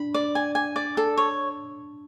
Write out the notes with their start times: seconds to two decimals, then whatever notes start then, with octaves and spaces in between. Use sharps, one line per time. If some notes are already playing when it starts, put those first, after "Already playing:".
Already playing: D4 B5
0.14 D5
0.35 G#5
0.55 G#5
0.76 D5
0.97 A4
1.17 C#5